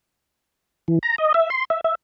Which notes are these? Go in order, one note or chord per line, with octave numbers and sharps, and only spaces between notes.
E3
A#5
D#5
E5
C6
E5
E5